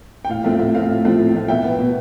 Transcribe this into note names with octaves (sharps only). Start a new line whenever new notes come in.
G5
A2 F5
F3 A3 C4 E5
A2 E5
F3 A3 C4 F5
A2
F3 A3 C4
A2
F3 A3 C4
B2 E5 G5
B3
B2